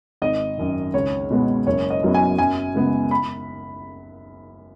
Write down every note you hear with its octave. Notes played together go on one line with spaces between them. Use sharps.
G#1 D#5
F#2 D#3
C#2 C#5
B2 G#3 B3
F#1 C#5
D#5
F#2 F#3 B3
G#5
F#2 G#5
C#3 G#3 B3
B5